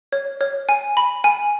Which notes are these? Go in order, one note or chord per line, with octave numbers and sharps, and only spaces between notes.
C#5
C#5
G#5
B5
G#5